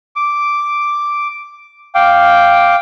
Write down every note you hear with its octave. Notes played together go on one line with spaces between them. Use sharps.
D6
F5 G5 D6